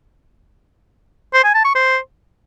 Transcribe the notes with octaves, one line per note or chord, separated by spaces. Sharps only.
C5
G#5
A5
C#6
C5